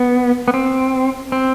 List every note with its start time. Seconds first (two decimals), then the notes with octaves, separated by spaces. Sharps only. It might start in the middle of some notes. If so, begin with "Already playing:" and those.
Already playing: B3
0.48 B3
0.54 C4
1.32 C4